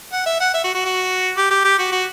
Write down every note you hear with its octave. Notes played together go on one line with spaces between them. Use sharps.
F#5
E5
F#5
E5
F#4
F#4
F#4
G4
G4
G4
F#4
F#4